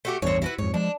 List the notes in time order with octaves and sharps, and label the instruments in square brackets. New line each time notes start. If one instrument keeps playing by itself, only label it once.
[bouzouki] A3 F#4 G4
[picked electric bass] A1 E2 G2 [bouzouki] C4 C#5
[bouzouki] E4 F#4 B4
[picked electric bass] F2 G#2 [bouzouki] C#5
[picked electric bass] F3 G#3 [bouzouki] D4